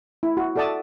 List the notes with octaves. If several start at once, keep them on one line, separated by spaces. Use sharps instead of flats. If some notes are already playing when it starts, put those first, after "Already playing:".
E4
F#4
F#4 A4 D5 E5 A5 D#6